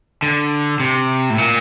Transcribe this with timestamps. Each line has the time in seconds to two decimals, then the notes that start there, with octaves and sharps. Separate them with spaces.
0.22 D3
0.80 C3
1.30 A2
1.38 A#2